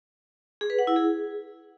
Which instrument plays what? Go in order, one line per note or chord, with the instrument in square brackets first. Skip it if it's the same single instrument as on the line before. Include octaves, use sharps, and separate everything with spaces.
[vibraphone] G#4
B4
F#5
E4
G#4